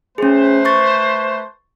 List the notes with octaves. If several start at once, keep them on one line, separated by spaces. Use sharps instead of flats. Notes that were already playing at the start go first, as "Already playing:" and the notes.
A3 C#4 G#4 B4 C5
C6 C#6 A6